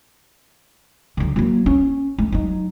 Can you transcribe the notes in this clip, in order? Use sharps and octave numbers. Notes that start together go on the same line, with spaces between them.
D3 F#3
F#3 A#3
C#4
A3
F#3 D#4